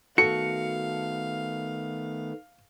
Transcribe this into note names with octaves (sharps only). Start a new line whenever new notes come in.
D#3 A3 B3 F#4 A4 F5 C#7